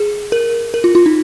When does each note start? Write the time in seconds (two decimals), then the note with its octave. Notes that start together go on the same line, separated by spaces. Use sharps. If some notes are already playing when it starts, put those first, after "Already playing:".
Already playing: G#4
0.32 A#4
0.74 A#4
0.84 F4
0.95 F4
1.06 D#4